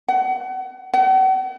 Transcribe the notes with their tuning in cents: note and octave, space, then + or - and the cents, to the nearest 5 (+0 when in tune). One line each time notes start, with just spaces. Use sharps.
F#5 +30
F#5 +45